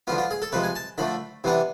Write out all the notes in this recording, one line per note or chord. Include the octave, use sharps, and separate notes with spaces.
D3 F3 B3 F4
F4
G#4
A4
C3 F3 G#3 B4
G#5
A5
D3 F3 A3 B5
C3 E3 B3 D4